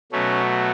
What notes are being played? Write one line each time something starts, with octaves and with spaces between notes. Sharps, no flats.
B2 F#3 A3 C#4